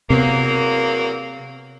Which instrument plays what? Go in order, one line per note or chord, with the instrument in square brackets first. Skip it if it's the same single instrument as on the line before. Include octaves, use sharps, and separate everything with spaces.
[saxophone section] E2 F#3 A#3 [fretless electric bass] C3 B3